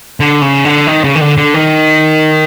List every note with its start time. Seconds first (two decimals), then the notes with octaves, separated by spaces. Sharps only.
0.20 D3
0.42 C#3
0.65 D3
0.87 D#3
1.04 C#3
1.15 D#3
1.21 D3
1.38 D3
1.54 D#3